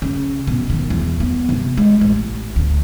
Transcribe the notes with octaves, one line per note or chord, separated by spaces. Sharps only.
C#3
B2
D#3
E2
B3
C3
G#3
A1
D2